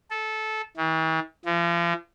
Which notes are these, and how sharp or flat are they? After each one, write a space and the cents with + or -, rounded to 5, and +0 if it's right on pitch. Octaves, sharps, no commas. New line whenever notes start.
A4 -15
E3 -45
F3 -40